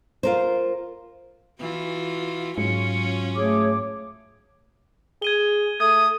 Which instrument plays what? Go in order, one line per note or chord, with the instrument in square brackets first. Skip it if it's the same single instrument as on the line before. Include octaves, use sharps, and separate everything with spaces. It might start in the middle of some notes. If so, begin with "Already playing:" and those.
[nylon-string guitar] F4 A#4 C5
[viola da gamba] E3 F4 F#4
[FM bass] G#2 [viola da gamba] F#3 C#4 F4 [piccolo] C#7
[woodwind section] A3 G#4 C#5 [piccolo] D6
[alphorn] G#4 [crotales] G#6 D#7 G7
[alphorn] A3 [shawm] D#6 [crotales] G#6